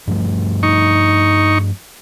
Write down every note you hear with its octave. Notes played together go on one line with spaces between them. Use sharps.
G2 F3 A3
D#4 C#6